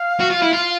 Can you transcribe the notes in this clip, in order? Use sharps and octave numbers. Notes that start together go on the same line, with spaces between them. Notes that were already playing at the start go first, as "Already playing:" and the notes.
Already playing: F5
F#4
F4
E4
F4